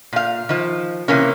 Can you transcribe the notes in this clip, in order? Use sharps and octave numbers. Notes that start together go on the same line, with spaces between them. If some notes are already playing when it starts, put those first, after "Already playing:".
A#2 F5
D#3 F3
C3 E3 A#3 C#4